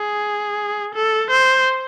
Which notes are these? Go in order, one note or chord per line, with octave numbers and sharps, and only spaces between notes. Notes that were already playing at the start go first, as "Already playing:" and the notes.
Already playing: G#4
A4
C5